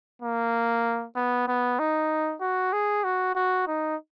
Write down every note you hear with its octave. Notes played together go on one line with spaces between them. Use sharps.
A#3
B3
B3
D#4
F#4
G#4
F#4
F#4
D#4